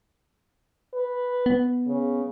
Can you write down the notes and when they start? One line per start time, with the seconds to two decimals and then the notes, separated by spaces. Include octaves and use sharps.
0.94 B4
1.46 B3
1.87 C#3